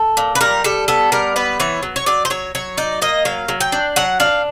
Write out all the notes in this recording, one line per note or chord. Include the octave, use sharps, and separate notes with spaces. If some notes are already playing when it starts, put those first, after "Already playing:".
Already playing: A4
A#2
B4
G3 A#4
G3 A4
B3 A4
G3 A#4
B3 B4
E3 C#5
F#3
C#5
F#3 D5
C5
F#3 C#5
F#3 C#5
D#4 D5
A#3 D#5
F#3 F5
F#3
G5
D4
F#3 F#5
D4 F5